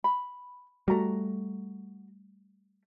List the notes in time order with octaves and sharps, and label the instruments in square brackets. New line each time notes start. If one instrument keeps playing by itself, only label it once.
[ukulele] B5
[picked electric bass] G3 A3 [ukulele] F#4 A#5